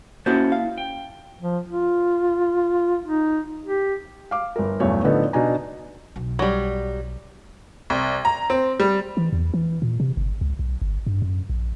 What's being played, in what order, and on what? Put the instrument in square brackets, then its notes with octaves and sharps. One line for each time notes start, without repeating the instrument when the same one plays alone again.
[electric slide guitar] A#3 E4 A5 [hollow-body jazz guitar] C#4 F#4 C5
[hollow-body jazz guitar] F5
[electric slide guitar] G5
[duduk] F3
F4
D#4
G4
[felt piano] F5 D6
G1 A#4
B1 E2 G2 F#3 A3 C#5
A2 D3 F3 B3 D#4 A4
B2 D4 D#4 G#5 A#5
[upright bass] B1
[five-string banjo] F#3 G3
[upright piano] C2
A#5
C4
G3
[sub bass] E3
E2
E3
A#2
C3
G1
C#2
B1
G1
G2
F#2
A#1